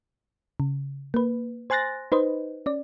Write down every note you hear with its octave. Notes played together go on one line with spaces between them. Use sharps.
C#3
A#3 B4
C5 G#5 C6 F#6 A6 A#6
D#4 B4 C5 D#5
C#4 D5